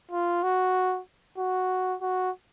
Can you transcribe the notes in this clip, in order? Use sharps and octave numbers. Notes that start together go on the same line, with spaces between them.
F4
F#4
F#4
F#4